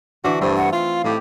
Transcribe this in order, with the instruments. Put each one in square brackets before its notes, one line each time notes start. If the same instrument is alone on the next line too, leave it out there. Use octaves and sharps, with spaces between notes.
[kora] D3 E3 [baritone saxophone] F#4
[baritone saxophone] G2 [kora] A3 C4
[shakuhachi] F#5
[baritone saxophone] F4 [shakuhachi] F5
[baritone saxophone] A2 [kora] D#4 G4